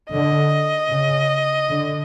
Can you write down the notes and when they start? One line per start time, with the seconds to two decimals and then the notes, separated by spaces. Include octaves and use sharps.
0.11 D3 D#5
0.91 C#3
1.69 D3